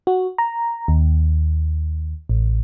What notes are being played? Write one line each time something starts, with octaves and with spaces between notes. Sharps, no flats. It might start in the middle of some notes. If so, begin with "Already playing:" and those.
F#4
A#5
D#2
A1